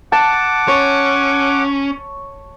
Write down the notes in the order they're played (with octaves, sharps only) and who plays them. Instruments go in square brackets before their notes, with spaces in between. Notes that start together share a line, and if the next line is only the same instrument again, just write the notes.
[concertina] F#5 D6 [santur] A5
[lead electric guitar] C#4 [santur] C#5